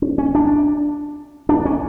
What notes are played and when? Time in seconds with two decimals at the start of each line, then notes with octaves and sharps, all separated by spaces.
0.02 C#4
0.18 C#4
0.35 D4
1.49 D4
1.65 C#4